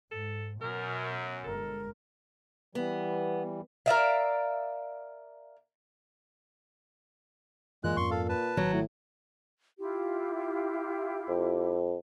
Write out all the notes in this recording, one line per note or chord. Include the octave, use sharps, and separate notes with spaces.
G#2 A4
F#2 B2 A#4
G1 G#3 A4 A#4
E3 G3 B3
A#4 D5 E5 F5
F#2 A#2 E3 G#3 F#6
F2 G#2 C#4 C6 C#6
A4 F5
B4 A5
G#1 D#3 F#3
A2
E4 F4 G4
F2